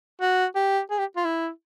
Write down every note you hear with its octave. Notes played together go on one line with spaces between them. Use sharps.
F#4
G4
G#4
G4
F4
E4